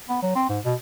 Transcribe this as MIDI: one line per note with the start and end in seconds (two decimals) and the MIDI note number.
0.09 0.18 59
0.22 0.34 54
0.35 0.44 60
0.49 0.59 44
0.65 0.74 47